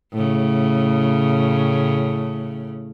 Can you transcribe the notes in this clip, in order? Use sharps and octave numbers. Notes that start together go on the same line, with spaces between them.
A2 C#3